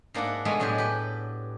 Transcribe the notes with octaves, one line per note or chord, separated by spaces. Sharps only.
G#2 A#3 D4 E4 F#5
B2 G#3 A3 B3
A2 F#3 G#3 D4 G4
G4 B4